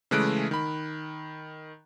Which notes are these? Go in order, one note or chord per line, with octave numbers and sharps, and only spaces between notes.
C#3 E3 G#3 A3 F#6 D7
D#3 B5